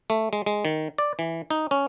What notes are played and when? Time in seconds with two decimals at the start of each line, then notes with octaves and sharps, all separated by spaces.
0.10 A3
0.33 G#3
0.46 G#3
0.65 D#3
0.98 D5
1.19 E3
1.51 D#4
1.71 C#4